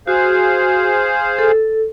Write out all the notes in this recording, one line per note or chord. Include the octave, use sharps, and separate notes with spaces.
F#4 G#4 C5 F5
A4